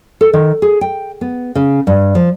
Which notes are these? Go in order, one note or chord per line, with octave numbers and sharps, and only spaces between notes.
A4
D#3
G#4
G5
B3
C#3
G2
F3